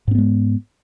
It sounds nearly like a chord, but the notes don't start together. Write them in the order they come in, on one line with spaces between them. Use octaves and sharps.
G#2 C4 B3 G#3